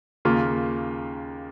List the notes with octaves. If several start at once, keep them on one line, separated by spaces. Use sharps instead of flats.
D#2 C#3 A#3 F4